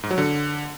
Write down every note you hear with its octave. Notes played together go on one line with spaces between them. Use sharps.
G#2
F#3
D3